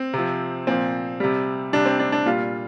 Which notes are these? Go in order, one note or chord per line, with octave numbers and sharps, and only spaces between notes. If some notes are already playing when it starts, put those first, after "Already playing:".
Already playing: C4
C3 F3
A#2 F3 C4
C3 G3
C3 G3 D4
C4
D4
D4
A#2 G3 F4